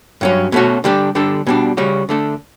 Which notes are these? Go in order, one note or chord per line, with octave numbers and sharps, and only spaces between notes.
G2 F#3 C#4
B2 A3 C#4 F#4
D3 G3 D4 G4
D3 G3 D4 A4
B2 G3 D4
C#3 G3 C#4 F#4
D3 A3 D4 A4